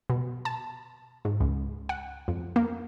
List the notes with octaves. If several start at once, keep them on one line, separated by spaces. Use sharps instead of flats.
B2
A5
G#2
C#2
F#5
F2
A#3